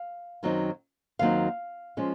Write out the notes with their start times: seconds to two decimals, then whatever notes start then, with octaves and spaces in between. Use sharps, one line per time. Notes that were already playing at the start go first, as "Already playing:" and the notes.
Already playing: F5
0.43 F#2 D#3 F#3 C4 D#4
1.19 D#2 D#3 F#3 C4 D#4 F5
1.97 F3 G#3 C#4